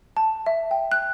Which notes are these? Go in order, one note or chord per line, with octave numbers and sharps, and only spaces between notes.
A5
E5
G5
F#6